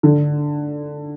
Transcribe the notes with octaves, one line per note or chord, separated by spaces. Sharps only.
D3